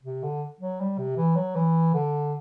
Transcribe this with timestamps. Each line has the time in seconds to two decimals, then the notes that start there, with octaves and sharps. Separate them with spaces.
0.04 C3
0.23 D3
0.61 F#3
0.80 G3
0.98 C3
1.17 E3
1.36 F#3
1.55 E3
1.94 D3